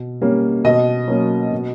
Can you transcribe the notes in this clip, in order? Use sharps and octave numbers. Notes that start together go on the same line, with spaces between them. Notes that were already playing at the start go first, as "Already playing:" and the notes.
Already playing: B2
G3 A#3 C#4
B2 D#5
F#3 A#3 C#4
B2